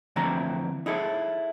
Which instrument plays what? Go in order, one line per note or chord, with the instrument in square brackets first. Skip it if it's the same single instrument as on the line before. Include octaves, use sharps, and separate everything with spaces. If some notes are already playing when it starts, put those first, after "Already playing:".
[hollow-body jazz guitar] F2 D3 E3 A3 C4 A#5
D#4 E4 G#4 A4